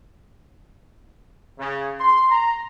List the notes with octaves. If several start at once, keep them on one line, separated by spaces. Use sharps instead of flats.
C#3
C6
A#5